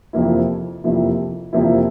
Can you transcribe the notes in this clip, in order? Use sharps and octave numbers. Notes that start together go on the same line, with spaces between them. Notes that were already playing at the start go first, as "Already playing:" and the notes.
F2 C3 F3 A#3 E4
F2 C3 F3 A#3 E4
F2 C3 F3 A#3 E4